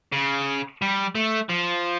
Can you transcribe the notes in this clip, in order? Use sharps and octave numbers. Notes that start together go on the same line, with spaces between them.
C#3
G3
A3
F3